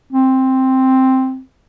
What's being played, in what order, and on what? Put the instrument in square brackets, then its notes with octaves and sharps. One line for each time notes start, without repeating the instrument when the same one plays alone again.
[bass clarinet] C4